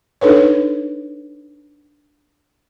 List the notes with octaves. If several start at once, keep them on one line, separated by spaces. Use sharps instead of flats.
D4 D#4 A4 B4 C#5